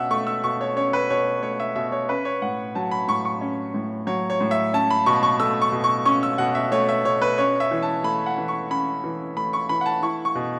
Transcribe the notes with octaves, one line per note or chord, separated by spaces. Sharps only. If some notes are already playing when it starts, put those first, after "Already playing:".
Already playing: B2 C#4 E5 F#5 E6
A3 C#6
E6
B2 C#6
C#5
C#4 C#5
B4
B2 C#5
A3 C#5
E5
B2 E5
C#5
C#4 B4
C#5
A2 F#5
F#3 A5
B5
A2 C#6
C#6
C#4
A2
F#3 C#5
C#5
A2
E5
C#4 A5
B5
B2 C#6
C#6
A3 E6
C#6
B2
C#6
C#4 C#6
E6
B2 F#5
E5
A3 C#5
E5
B2 C#5
B4
C#4 C#5
E5
E3
A5
A3 B5
F#5
E3
C#6
C#4 B5
E3
A3 B5
C#6
E3 B5
F#5
A5
E4 C#6
C#6
B2